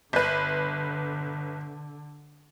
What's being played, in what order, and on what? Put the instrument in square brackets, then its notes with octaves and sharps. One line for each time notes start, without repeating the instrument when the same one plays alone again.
[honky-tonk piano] G1 B4 [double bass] D3